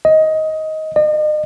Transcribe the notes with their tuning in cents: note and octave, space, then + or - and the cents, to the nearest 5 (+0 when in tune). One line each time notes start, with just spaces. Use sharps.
D#5 +15
D#5 -40